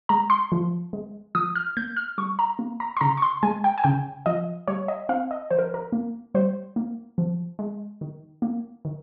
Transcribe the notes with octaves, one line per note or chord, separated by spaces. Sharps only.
G#3 A#5
C6
F3
G#3
F3 D#6
F6
A#3 G6
F6
G3 C#6
A#5
A#3
A#5
C6
C#3 A#5
C#6
C6
G#3 G#5
G5
G#5
C#3 G5
F3 D#5
G3 C#5
D#5
C4 F5
D#5
F3 C5
A#4
A#4
A#3
G3 C5
A#3
F3
G#3
D#3
A#3
D#3